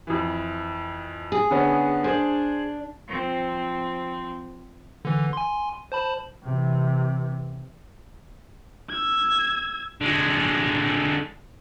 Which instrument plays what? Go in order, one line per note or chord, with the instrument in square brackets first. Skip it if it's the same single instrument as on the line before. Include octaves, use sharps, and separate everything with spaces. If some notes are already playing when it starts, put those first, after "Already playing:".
[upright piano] F2 E3
[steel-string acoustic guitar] G#4
[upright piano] D3 B3 C#4
[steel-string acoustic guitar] D4 [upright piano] G#4 C5
[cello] F3 C4
[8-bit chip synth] D3 E3
G#5 C6
C5 A5 B5
[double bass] C3 E3
[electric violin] E6 G#6
[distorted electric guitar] D3 G#3